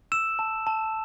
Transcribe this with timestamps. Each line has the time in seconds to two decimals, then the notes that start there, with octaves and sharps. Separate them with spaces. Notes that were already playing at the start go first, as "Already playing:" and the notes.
0.12 E6 E7
0.39 A5
0.67 A5